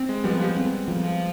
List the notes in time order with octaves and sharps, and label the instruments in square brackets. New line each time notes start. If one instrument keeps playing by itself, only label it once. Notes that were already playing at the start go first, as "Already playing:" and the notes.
Already playing: [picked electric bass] C4
[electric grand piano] G#3
[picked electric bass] F3 [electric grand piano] G3 B3
[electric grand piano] G3 B3
[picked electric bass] C4
F3